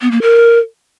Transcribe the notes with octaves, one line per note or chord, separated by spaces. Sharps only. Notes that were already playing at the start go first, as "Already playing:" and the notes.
B3
A#3
A#4